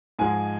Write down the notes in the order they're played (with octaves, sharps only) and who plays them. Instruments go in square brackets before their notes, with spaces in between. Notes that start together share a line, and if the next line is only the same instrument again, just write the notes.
[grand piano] G#2 F3 G#3 G#5